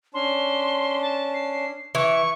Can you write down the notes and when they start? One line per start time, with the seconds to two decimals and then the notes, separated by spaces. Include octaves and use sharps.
0.14 C#4 D4 C6
1.02 A5
1.34 C7
1.95 E3 C#6